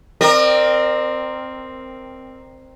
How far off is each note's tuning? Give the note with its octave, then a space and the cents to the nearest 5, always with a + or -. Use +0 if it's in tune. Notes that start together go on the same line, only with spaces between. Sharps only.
C4 +0 A#4 +0 D5 +45